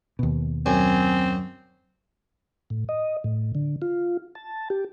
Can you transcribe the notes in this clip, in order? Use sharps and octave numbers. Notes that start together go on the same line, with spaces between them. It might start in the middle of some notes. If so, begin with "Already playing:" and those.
D#2 B2
F#2 C4 G#5
A2
D#5
A2
D3
F4
A5
G4